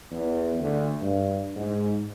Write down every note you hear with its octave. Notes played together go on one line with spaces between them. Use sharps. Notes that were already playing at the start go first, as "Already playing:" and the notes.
E2
D2
G2
G#2